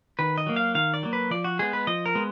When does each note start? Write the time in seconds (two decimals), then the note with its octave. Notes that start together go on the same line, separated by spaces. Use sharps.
0.19 D#3 B4
0.38 D#5
0.46 F#3 A#3
0.56 F5
0.75 D#3 F5
0.94 D5
1.03 F#3 A#3
1.13 B4
1.31 F3 D5
1.44 F#4
1.59 G#3 B3 G#4
1.73 B4
1.87 F3 D#5
2.06 A#4
2.15 G#3 B3